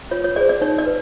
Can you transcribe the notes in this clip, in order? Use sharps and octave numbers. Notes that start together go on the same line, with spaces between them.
F4 C#5
C#5
G#4 C5 D5
D5
D#4 C#5
D5
B4